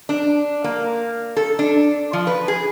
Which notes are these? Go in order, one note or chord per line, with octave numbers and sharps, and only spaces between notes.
D4
A#3
A4
D4
F3
B4
G#4